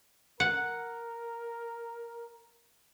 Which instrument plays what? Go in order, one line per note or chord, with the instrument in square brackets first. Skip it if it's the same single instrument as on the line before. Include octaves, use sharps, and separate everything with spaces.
[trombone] A#4 [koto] F#5